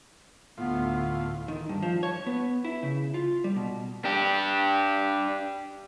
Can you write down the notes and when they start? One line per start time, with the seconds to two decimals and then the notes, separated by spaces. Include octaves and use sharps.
0.57 D2 A2 B3 F4
1.48 D#3
1.69 G2
1.83 F3
2.03 C#5
2.27 B3
2.65 E4
2.83 C#3
3.14 F4
3.44 G3
3.56 B2
4.05 D4 G4